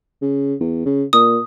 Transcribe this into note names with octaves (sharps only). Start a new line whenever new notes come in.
C#3
E2
C#3
A#2 D#6